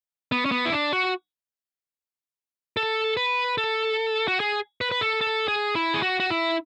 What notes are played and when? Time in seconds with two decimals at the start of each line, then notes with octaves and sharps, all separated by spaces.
0.32 B3
0.45 C#4
0.52 B3
0.65 E4
0.72 D4
0.93 F#4
2.77 A4
3.17 B4
3.58 A4
4.28 F#4
4.40 G#4
4.81 B4
4.92 B4
5.01 A4
5.21 A4
5.48 G#4
5.75 E4
5.94 G#4
6.03 F#4
6.20 F#4
6.31 E4